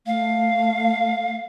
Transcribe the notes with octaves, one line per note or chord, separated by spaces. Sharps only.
A3 F5